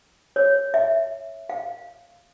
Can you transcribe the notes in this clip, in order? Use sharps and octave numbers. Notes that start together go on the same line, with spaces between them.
C#5
E5
F5